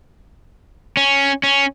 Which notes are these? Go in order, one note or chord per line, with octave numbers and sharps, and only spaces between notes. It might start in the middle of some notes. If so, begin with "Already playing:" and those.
C#4
C#4